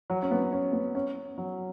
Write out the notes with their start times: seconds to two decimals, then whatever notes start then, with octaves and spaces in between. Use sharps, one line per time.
0.10 F#3
0.23 C#4
0.31 B3
0.53 C#4
0.73 B3
0.95 C#4
1.38 F#3